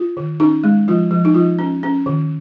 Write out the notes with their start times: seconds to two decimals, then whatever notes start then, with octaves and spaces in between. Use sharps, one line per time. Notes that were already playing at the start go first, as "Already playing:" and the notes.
Already playing: F4
0.17 D#3
0.40 C#4 D#4
0.64 G#3
0.88 F3 F4
1.11 F3
1.25 D#4
1.34 F3 F4
1.59 C#4
1.83 C#4
2.06 D#3